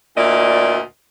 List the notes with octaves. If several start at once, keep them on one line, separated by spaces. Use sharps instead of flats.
D2 A#2 E4 D5 D#5